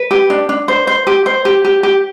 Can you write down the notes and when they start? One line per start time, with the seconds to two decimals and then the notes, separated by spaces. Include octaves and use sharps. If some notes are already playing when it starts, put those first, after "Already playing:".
Already playing: B4
0.11 G4
0.30 D4
0.49 D4
0.68 C5
0.87 C5
1.07 G4
1.26 C5
1.45 G4
1.65 G4
1.83 G4